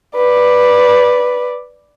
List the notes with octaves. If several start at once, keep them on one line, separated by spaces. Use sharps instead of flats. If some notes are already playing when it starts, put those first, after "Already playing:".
B4 D5